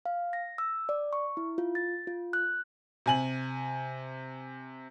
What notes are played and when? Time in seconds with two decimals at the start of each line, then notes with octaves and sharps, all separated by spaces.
0.06 F5
0.33 A#6
0.58 E6
0.89 D5
1.13 C#6
1.37 E4
1.58 F4
1.75 A6
2.07 F4
2.33 F#6
3.06 C3 G#5 F#7